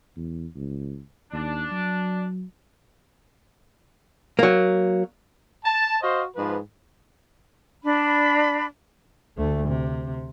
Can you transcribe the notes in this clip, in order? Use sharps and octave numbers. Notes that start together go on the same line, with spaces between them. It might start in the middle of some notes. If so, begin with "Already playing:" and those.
E2
C#2
D#2 D4
F#3
F#3 A#3
A5
F#4 C5 D#5 F5
G#2 F3 B4
D4 B5
D2 A3
C3